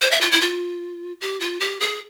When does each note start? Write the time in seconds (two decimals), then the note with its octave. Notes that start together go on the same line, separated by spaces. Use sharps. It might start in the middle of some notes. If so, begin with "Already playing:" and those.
0.01 C5
0.11 E5
0.21 F4
0.32 E4
0.41 F4
1.21 G4
1.40 F4
1.60 G4
1.80 G#4